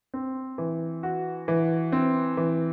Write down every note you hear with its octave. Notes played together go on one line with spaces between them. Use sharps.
C4
E3
F#4
E3
C4
E3